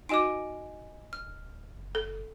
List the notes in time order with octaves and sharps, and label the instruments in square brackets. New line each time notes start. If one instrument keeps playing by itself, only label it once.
[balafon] D#4 F#4 D6 [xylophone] D#5 G#5 D7
[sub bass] D1 [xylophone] F6
[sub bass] F#1
[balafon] A4